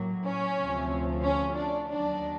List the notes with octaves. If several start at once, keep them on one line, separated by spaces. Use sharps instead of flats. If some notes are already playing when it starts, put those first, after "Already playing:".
Already playing: A2 F#3 A#3
C#4
D2 C3 F3 A3 C4
C#4
D4
D#2 D#3 F#3 D4